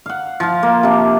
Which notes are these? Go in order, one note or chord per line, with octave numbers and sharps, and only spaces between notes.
F5 F#5
F3 F4
A#3
C3 D4